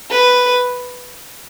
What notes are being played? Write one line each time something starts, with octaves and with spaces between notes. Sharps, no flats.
B4